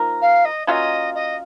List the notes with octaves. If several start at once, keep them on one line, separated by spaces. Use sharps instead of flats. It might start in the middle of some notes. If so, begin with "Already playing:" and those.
Already playing: F3 A#3 D#4 A#4
F5
D#5
F#3 A#3 C#4 F4 D#5 F5
D#5